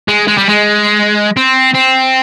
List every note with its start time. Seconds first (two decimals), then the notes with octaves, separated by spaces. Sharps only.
0.08 G#3
0.28 G#3
0.37 G3
0.49 G#3
1.37 C4
1.74 C4